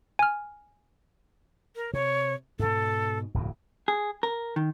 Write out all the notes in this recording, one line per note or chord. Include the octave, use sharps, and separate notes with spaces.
G#5 F6
A#4
C3 C#5
G#2 B2 A4
D1 F2 B2
G#4
A#4
D#3